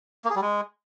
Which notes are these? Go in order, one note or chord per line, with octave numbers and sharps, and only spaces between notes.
A#3
G#4
G3
G#3